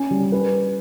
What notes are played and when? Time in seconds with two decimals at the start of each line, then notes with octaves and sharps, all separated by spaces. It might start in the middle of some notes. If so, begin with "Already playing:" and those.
Already playing: C#4
0.11 G3
0.32 B4